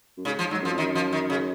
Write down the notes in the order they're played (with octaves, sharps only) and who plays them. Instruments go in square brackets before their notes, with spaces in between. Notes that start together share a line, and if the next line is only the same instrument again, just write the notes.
[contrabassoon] F#2
[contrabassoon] G#2 [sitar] C#3
[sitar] F3
[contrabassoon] G#2 [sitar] F#3
[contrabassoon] F#2 [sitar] F3
[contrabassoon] F2
[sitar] D#3
[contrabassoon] F#2
[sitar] F3
D#3
C#3